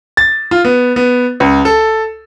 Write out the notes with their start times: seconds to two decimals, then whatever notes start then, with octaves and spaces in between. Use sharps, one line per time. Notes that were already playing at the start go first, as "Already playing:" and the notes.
0.17 A6
0.51 F4
0.65 B3
0.96 B3
1.40 C#2
1.65 A4